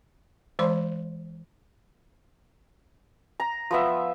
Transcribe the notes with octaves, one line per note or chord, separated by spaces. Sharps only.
E3 G#3 C5 D5 B5 C6
A#5
F3 B3 E5